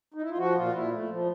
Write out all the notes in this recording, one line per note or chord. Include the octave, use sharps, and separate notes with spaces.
D#4
E4
F4
F3 F#4
A#2 F4
A#2 E4
A3
F3